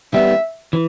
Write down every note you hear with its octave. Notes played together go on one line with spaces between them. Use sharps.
G3 B3 E5
E3